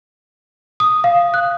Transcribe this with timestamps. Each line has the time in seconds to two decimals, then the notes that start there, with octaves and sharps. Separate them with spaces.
0.80 D#6
1.04 F5
1.34 F#6